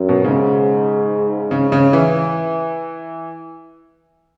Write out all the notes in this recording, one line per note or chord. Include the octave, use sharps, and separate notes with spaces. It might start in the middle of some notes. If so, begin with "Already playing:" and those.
Already playing: F#2
B2
G#2 C#3
C#3
C#3
E3